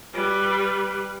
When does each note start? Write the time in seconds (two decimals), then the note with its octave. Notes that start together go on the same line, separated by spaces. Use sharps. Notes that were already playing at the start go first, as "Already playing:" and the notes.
0.13 G3 B4